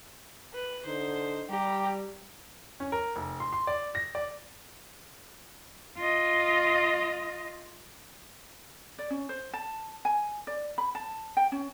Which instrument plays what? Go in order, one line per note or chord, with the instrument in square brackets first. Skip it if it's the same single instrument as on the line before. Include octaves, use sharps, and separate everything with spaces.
[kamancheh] B4
[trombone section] D3 D#4 [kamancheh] C5
[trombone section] G3 [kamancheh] G4 A#5
[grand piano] C#4
A#4
F1
C6
C6
D5
A#6
D5
[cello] F4 D#5
[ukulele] D5
C#4
C5
A5
G#5
D5
B5
A5
G5
C#4